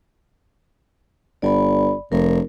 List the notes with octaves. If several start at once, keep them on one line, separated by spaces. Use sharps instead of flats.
G1 D5 B5
F1 A#4